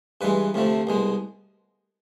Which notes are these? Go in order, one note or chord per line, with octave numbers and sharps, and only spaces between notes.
G2 E3 G#3 B4
D2 C3 F3 A3
C2 B2 G#3